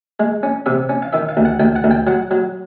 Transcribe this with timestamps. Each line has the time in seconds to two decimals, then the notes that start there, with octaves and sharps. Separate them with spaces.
0.20 G#3
0.43 C#4
0.66 C3 E5
0.89 C#4
1.02 F5
1.13 D#3 E5
1.29 F5
1.37 D2
1.45 F#5
1.60 D2 G5
1.76 F#5
1.84 D2
1.91 G5
2.07 F#3 F#5
2.31 F#3